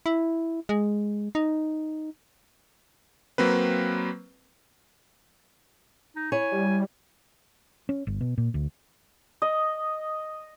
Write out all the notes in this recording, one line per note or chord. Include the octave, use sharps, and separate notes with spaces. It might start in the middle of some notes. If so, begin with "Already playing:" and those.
E4
G#3
D#4
F#3 A#3 C4 B4
D#4
E4 C#5 G#5
G3
C#4
G1
B2
A#2
D2
D#5